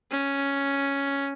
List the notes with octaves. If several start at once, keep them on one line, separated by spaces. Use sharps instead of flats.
C#4